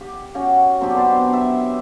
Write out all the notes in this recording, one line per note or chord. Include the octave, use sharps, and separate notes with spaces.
G4
C#4 F#4 G5
F#3 C4 D4 G4
B3 C5 D5
E5